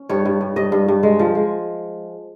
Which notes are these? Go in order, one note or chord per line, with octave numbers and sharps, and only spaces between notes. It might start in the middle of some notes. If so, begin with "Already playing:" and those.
Already playing: C#4
G2 C#5
G2
G2
G2 D#5
G2
G2
G#3
F3
G#3